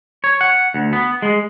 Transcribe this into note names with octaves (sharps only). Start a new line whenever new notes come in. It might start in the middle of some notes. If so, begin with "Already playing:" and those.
C#5
F#5
D2
B3
G#3